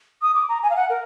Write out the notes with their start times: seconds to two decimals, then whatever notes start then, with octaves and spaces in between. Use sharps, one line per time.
0.21 D#6
0.34 D6
0.48 A#5
0.62 G#5
0.69 F5
0.75 F#5
0.89 A#4